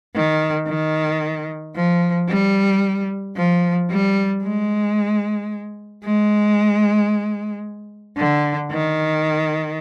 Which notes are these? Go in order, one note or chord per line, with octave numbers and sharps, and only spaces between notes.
D#3
D#3
F3
G3
F3
G3
G#3
G#3
D3
D#3